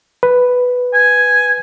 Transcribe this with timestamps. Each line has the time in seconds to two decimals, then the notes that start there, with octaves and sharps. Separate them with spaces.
0.23 B4
0.94 G#5